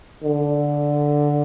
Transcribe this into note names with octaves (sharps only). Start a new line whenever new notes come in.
D3